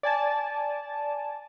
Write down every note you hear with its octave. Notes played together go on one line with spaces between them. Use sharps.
D5 G#5 A5